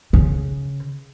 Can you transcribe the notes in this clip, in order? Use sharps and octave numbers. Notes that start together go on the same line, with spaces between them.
C#3